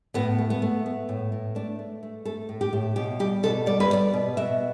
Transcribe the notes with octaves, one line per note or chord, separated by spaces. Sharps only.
A2 B3
A3
B3
A3
A3
A2
A2
A3 D4
A3
A3
A3 A4
A2
G4
A2
B2 G4
G3 G4
B2 A4
G3 D5
B4
G3 D5
B2
B2 E5